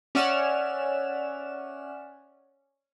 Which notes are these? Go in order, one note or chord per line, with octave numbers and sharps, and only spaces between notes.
C#4 D5 E5 F#5 F6 E7